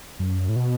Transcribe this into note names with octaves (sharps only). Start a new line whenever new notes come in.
F#2
A2
B2